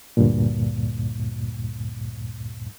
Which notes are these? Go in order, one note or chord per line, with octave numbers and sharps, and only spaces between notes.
D2 G2 A#2